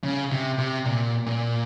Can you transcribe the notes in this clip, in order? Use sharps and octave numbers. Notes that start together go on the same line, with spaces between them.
C#3
C3
C3
A#2
A#2